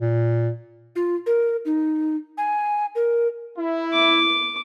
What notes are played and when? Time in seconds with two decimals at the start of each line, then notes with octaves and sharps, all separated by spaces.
0.01 A#2
0.96 F4
1.26 A#4
1.65 D#4
2.38 G#5
2.96 A#4
3.59 E4
3.93 D6